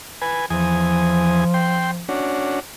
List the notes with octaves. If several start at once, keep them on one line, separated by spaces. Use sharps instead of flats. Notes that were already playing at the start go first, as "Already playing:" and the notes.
B4 G#5
E2 F3 G#5 D#6
G5 C6
C#4 D4 F#4